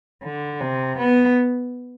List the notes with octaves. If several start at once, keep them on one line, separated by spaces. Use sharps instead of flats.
D3
C3
B3